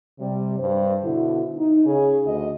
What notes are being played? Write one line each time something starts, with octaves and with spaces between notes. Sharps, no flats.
C3 G3
G2 C5
B2 D3 E4
D#4
C#3 G#4
D2 D#5